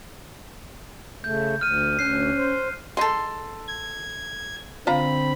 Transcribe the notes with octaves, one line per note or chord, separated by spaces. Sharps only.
C#3 A3 G6
D2 F6 D#7
D2 C#4 F#6 C7
C5
G#3 D#4 A4 C6
G#6
D3 C4 F4 F5 A#5 B5